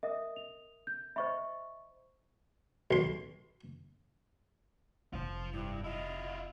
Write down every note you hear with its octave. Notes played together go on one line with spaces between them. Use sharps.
A#4 D#5 E5 D#6
F7
G6
C5 D#5 E5 B5 C#6
B1 C6
F1 C3 F4 C5
G2 E4
E4 F4 D#5